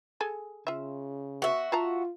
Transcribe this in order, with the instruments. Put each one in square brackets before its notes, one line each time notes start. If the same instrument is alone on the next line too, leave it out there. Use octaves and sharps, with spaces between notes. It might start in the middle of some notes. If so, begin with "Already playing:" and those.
[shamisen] G#4 A4 G#5
[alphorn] C#3 [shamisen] F4 E5
[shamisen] B3 [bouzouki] F#4 E5
[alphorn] F4 [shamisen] F5 A5 A#5